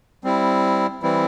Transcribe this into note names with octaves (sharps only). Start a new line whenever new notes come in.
G3 C4 E4
E3 G3 C4 E4